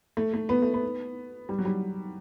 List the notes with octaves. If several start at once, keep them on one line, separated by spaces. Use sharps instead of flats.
A3
A3
B3
A3
B3
G3
F#3
G3